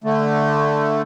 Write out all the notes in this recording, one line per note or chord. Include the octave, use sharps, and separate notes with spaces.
D3 A3